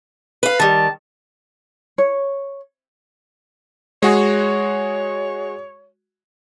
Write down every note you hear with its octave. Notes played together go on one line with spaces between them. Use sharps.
B4 F5
D#3 G3 A5
C#5
G#3 F#4 G#4 C#5